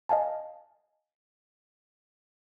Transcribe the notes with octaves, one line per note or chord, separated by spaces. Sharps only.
D#5 F5 G#5 A5